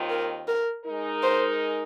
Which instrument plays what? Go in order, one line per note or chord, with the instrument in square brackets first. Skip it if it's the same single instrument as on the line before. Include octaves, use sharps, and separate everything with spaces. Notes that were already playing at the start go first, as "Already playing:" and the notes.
Already playing: [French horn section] D#2 D#3 C4 F4
[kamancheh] A#4
A#4
[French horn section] G#3 D#4 A#4
[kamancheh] C5